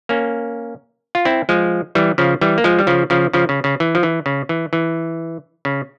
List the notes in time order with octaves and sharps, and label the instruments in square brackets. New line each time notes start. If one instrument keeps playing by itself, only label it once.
[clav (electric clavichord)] A#3 C#4
F4
C4 E4
F3 G#3
E3 G3
C#3 F3
E3 G3
A#3
F3 G#3
G3
C#3 F3
C#3 F3
C#3 F3
C#3
C#3
E3
F3
E3
C#3
E3
E3
C#3